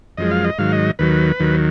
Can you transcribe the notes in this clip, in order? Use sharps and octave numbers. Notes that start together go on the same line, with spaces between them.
F#2 F3 G#3 D#5
F5
D#5
G#2 D#3 F#3 F5
D#5
D#2 D#3 F#3 B4
D#2 D#3 F#3